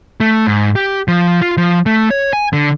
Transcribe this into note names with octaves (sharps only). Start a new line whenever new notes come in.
A3
G#2
G4
F3
F4
F3
A3
C#5
G#5
D3